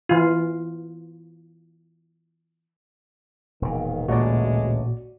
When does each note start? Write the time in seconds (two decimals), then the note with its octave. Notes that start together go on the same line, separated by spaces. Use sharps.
0.09 E3 F4
3.62 E1 A#2 D#3
4.08 A1 D2 A#2 D3 G#3 F#4 D5